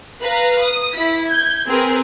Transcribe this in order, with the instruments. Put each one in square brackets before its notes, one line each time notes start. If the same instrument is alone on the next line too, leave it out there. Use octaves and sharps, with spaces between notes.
[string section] B4 F5 A#5
D#6
E4 B6
G6 G#6
C4 G#4 A#4 B4